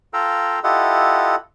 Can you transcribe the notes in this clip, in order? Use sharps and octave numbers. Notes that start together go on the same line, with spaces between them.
F4 A4 F5 G5 A#5 E6
E4 F4 G4 A4 D#5 F#5